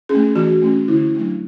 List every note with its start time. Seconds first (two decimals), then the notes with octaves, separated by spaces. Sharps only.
0.09 C#4 G#4
0.15 A3
0.35 E3 F#4
0.62 A3 C#4
0.88 D3 E4
1.15 F#3 A3 D4